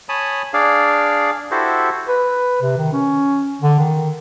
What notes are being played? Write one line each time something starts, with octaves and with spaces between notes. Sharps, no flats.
C#5 G#5 A5 B5 D#6
D4 G#4 D5 F5
E4 F#4 G4 A4 C5
B4
C3
D#3
C#4
D3
D#3